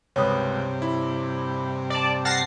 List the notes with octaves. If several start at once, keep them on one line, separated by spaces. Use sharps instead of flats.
C#2 G2 C3 B4 C#5 D#6
E4
D5 A5
F#5 A5 F6 A6 A#6 C7